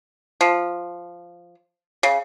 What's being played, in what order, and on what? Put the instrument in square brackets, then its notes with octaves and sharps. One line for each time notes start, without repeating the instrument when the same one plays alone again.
[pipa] F3
C#3